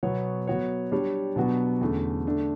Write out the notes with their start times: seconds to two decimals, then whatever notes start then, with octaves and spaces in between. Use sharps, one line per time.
0.03 B2 F#3 B3 F#4 C#5
0.47 F#3 B3 F#4 C#5
0.92 G3 D4 G4 C#5
1.36 B2 F#3 B3 D4 F#4
1.81 E2 D3 A3 C#4
2.25 D3 A3 D4